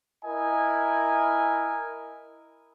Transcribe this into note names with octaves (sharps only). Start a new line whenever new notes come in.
E4 A#4 D#5 G#5